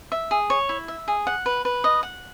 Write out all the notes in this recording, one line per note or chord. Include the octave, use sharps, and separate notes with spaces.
E5
G#4
C#5
E4
E5
G#4
F#5
B4
B4
D#5
F#5